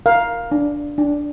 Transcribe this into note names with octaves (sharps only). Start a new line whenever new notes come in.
A#4 F5
D4
D4